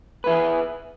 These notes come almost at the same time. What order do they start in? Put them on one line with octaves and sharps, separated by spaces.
B4 E4 G#4